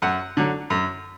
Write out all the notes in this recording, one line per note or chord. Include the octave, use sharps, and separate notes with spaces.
F#2 F#5
D3 F#3
F#2